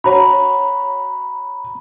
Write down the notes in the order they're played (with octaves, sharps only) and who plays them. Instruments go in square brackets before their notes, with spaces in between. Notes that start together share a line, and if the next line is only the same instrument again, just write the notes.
[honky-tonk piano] F#4 C#5 [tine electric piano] A#5 B5